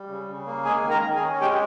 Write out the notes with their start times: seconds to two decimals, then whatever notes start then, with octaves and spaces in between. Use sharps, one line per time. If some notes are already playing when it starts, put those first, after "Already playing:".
Already playing: G3
0.08 C#3
0.26 C#3
0.46 A#3
0.65 G#3 G#4 G#5
0.84 D#3
0.90 A#4 A#5
1.03 D#3
1.16 G#4 G#5
1.22 C#4
1.41 G#3 G4 G5